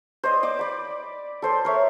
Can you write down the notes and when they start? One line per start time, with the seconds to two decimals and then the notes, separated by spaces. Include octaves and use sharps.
0.23 C5 D5 D#5
0.43 D5 D6
0.59 D5 B5
1.42 A4 C5 D5
1.65 A#4 C#5 E5